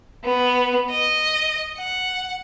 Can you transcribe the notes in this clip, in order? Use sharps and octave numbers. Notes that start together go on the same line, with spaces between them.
B3
D#5
F#5